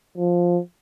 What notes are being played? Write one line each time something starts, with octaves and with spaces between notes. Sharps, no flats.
F3